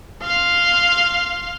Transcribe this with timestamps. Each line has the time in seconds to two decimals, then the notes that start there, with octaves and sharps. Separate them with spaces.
0.22 F5 C6